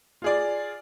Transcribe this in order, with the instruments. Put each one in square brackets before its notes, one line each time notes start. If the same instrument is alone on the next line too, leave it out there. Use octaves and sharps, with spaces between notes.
[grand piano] F4 G#4 D5